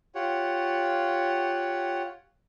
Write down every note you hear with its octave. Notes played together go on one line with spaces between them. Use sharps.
F4 G4 C#5 F#5